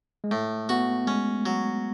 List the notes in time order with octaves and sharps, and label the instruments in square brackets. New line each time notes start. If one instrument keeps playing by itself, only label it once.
[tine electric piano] G#3
[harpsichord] A2 [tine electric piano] A3
[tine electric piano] B3 [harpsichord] F#4
[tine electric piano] G#3 [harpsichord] C#4
[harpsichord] F#3